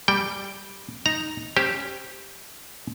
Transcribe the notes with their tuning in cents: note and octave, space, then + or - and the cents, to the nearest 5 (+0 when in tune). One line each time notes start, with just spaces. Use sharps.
G3 +0 G5 +0
D#4 +0 A#5 +0
C#4 +0 G4 +0 C5 +0